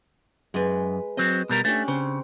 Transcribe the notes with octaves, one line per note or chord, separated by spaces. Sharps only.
F#2 G#3 B4
F#3 C4 D#5
B2 G3 A#4
A3 C#4 D4 G4
C#3 C4